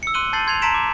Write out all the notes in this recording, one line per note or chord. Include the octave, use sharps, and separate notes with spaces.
E6 C#7
C6 D6 F#6 D#7 F#7 G7
A5 G6 A6 C7 D#7 F#7
C6 G#6 A6 C7 F7
A5 A#5 C6 B6 D7 E7
D6